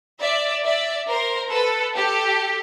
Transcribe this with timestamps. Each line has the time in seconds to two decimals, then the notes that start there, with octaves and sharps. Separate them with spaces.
0.21 D5 E5
0.64 D5 E5
1.08 A#4 C5
1.51 A4 B4
1.95 G4 A4